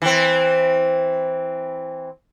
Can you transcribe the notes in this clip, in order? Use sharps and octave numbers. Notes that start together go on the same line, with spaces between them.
E3 C4